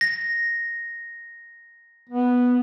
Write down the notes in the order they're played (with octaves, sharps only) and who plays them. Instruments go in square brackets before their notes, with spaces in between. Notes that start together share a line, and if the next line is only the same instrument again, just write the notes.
[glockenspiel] A#6
[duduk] B3